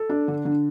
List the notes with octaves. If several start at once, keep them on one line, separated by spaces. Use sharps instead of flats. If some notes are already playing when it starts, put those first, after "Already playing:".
Already playing: A4
D4
D3
D3